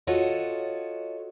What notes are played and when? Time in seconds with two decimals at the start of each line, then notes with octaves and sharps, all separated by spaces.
0.07 F4 F#4 A4 C#5 D#5